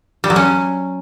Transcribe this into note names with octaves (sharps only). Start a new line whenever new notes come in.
G3
F#3
C#4